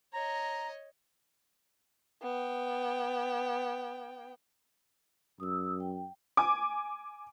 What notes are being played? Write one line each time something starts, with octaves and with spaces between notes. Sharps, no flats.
C#5 D#5 A#5
B3 G5
F#2 D#6 E6
G5
G#5 D6